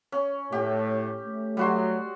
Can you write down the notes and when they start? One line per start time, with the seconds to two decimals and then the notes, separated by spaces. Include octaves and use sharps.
0.12 C#4
0.52 A2 G4
1.26 A3
1.57 F#3 G3 F#4 C6